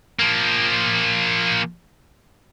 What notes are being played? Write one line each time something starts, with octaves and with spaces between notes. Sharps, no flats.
F3 A#3